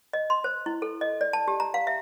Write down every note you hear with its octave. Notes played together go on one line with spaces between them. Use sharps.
D#5
C6
C5
E4
A4
D#5
D5
A5
G4
A#5
F5
E5